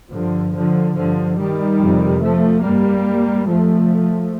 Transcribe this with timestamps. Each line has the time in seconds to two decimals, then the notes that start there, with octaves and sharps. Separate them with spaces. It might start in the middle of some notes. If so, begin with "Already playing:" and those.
0.11 G2 D3 F3
0.54 D3 F3
0.96 G2 D3 F3
1.37 D#3 G3
1.80 F2 C3
2.22 F3 A3
2.63 G2 G3 A#3
3.47 F2 C3 F3 A3